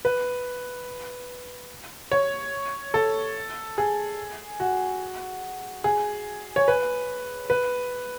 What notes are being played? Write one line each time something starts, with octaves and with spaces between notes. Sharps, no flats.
B4
C#5
A4
G#4
F#4
G#4
C#5
B4
B4